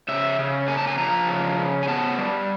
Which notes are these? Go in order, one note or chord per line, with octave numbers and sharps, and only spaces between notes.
C#3 E5
C#3
A#3 G#5
A5
G#5
F3 A#5
C#3
C#3
G#5
B3 A5
G3